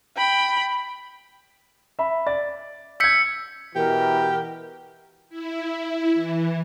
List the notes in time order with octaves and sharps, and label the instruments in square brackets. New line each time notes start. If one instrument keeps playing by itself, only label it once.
[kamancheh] G5 B5
[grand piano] E5 B5
D5 A6
[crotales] E6 B6 C#7 [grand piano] G6 G#6
[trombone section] B2 E3 [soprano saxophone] G4 [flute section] A#4
[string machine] E4
E3